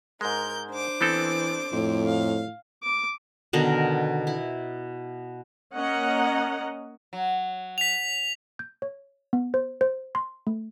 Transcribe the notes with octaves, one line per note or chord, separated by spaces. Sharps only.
G#2 G#3 A#4 G6
D4 C5 D6
E3 B3 C4 A4
F2 A2
F5
D6
B2 D3 D#3 A#4
E4
A#3 C#4 D#5 F#5 A#5
F#3
B6 F7
G6
C#5
B3
C5
C5
C6
A3